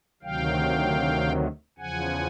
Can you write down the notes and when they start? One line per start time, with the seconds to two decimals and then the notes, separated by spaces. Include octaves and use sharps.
0.22 D2 C3 D#3 F#3 F5 G5
1.78 E2 C#3 F3 F#5 G#5